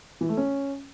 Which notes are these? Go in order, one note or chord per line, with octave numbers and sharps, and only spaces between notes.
E3
A3
C#4